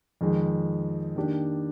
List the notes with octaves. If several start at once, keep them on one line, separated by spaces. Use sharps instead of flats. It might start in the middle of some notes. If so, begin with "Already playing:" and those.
F2 D#3 G#3
D#3 A#3 D4 G4